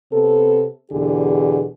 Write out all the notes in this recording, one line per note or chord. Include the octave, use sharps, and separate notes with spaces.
C3 B3 C4 A4
E2 B2 D3 G4 G#4